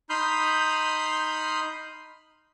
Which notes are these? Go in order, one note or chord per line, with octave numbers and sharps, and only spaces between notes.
D#4 B5 C6 D#6 F6 G6